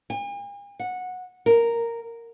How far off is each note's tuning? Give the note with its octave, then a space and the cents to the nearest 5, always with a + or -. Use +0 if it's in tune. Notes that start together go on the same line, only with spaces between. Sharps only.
G#5 -45
F#5 -15
A#4 -5